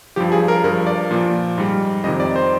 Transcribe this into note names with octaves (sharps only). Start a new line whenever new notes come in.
G2 F3 G4
G#4
A#4
G2 F3 A#4
D5
A#2 F3
G#2 G3
F2 C3 D#3 D#5
D5
C5